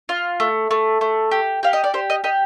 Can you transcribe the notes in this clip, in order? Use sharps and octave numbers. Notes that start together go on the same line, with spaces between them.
F4
A3
A3
A3
G4
G4 F5
D#5
D5
G4 C5
D#5
G4 D#5